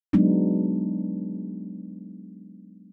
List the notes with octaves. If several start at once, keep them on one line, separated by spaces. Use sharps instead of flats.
F#3 G#3 B3 D4 D#4